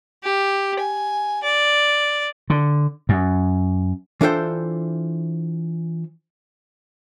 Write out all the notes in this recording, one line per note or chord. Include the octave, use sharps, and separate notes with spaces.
G4
G#5
D5
D3
F#2
E3 D4 F4 A4 C5 G5